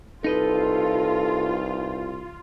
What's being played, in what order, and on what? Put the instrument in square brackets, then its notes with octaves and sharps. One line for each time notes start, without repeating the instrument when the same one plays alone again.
[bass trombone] C2 [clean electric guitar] D#4 B4 D#5 [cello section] F4 [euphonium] A4